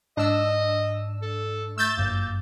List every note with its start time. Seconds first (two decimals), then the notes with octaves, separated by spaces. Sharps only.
0.17 G#2 D4 D#5 E6
1.22 A4
1.78 A3 E6 G6 A6
1.97 G1 F#2 A#3